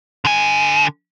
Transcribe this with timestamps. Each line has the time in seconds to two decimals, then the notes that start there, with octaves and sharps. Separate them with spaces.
0.25 D3 G#5